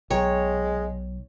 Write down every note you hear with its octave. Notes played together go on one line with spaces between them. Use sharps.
B1 G#3 C#5 G5 A#5